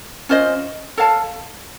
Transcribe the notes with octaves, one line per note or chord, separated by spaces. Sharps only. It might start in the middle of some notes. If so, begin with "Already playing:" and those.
C#4 F4 C5 D#5
A4 C#5 F5 A5